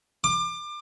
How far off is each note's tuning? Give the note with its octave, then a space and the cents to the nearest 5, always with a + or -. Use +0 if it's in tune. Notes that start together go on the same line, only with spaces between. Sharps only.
D6 +30